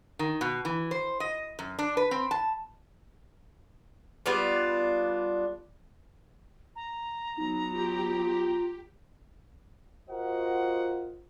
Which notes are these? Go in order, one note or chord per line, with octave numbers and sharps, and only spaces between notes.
D#3
B2
E3
C5
D#5
F#2
D4
B4
C4
A5
G3 B3 D4 F4
A#5
F#3 B3 D#4
F4 G4
F4 F#4 A#4 C5 D#5 F#5